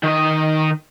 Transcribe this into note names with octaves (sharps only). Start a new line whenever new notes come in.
D#3 D#5